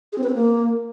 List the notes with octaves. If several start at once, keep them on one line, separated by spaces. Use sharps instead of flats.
G#4
C4
B4
C4
A#3